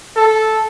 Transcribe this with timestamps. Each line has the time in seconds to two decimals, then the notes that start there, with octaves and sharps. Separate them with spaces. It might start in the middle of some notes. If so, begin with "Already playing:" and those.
0.16 A4